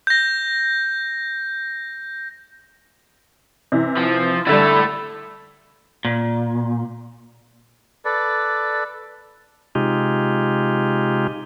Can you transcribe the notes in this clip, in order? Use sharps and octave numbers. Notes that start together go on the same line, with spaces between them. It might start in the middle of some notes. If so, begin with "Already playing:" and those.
G6 A#6
C3 E3
F3
D3 G3 A3 E4 A4
A#2
A4 B4 D5
C3 G#3 D#4 F4 G4